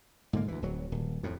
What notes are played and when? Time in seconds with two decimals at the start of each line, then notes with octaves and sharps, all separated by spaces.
0.33 G#2 D3 A#3
0.48 D2 E3
0.62 D1 F#3
0.92 D#1
1.23 F2 A2